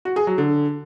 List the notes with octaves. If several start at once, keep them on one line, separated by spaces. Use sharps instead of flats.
F#4
G#4
F#3
D3